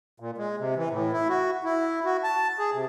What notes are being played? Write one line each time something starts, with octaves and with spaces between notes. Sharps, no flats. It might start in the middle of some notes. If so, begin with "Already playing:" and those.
A#2
G#3
C3
E3
A2
E4
F#4
E4
F#4
A5
G#4
C3